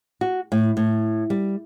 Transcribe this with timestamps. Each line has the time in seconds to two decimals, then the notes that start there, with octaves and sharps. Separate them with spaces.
0.21 F#4
0.52 A2
0.77 A2
1.30 G3